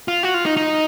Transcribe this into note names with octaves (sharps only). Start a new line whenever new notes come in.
F4
F#4
F4
D#4
D#4